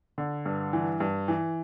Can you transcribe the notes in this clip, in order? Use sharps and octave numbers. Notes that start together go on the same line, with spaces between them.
D3
G2
E3
G2
E3